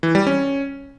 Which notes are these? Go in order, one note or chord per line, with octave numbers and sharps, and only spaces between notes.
E3
G3
C#4